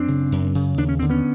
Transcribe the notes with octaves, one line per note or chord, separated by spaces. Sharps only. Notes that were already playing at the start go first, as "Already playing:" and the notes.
Already playing: F#2 C4 D4
C#3
F#2
C#3
D#2 D4
C#4
D3 C4
B3 C#4